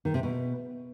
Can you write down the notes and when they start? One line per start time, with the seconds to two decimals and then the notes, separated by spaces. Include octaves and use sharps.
0.05 D#3
0.14 C3
0.23 B2